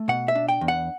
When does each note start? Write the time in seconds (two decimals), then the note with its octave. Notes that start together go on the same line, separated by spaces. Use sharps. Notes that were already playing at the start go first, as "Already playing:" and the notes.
Already playing: A3
0.08 B2 F#5
0.28 E5
0.35 D4
0.49 G5
0.61 E2
0.68 F#5